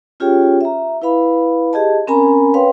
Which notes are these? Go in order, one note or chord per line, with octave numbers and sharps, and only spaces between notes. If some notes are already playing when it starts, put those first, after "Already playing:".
C#4 F4 G4 G#4 C#5 G5
E5 A#5
E4 B4 F5 B5
G4 G#4 D#5 A5
C4 C#4 A#4 G#5 A#5 B5
B4 C#5 F5 G5 C6